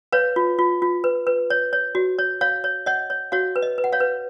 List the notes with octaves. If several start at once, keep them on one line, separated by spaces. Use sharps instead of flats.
B4 C#5 F5
F4
F4
F4
B4
B4
C#5
C#5
F#4
C#5
C#5 F5
C#5
C#5 D#5 F#5
C#5
F#4 C#5 F5
B4
D#5
B4
F#5
C#5 F5
B4